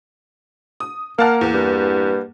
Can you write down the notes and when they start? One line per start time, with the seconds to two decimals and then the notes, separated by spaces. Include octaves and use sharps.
0.80 D#6
1.19 A#3 A#4 F5 F#5 A5 F6
1.41 E2
1.54 G2